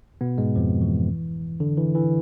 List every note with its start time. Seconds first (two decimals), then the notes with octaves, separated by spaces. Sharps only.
0.21 B2 B3
0.38 G#2 G#3
0.56 F2 F3
0.81 E3
1.60 D3
1.77 E3
1.95 E3